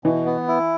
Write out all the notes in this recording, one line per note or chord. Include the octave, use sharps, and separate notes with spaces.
B2 E3
B3
E4